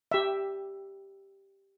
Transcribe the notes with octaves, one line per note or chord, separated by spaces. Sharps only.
G4 E5